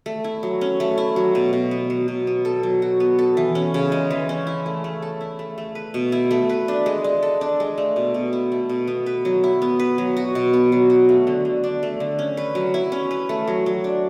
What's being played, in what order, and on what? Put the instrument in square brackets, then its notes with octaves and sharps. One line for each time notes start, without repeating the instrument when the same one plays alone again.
[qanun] A3
E4
F#3
C#4
A3
E4
F#3
B2
B2
B3
F#3
B2
B3
A4
F#3
F#4
B3
A4
E3
C#4
C#3
G#3
E3
C#4
E4
A3
A3
A4
E4
A3
A3
B4
B2
E4
A3
B4
D4
G#3
G#3
A4
D4
G#3
A3
B2
B2
E4
A3
B2
B3
B4
F#3
E4
B3
B4
F#3
F#4
B2
B3
F#3
F#4
A3
D3
D3
D4
A3
D3
C#4
B4
F#3
E4
C#4
B4
A3
F#3
F#3
D4